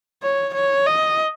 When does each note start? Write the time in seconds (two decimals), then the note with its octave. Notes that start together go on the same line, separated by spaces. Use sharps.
0.23 C#5
0.54 C#5
0.87 D#5